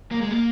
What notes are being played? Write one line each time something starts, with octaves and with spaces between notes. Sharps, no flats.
A#3
G#3
A#3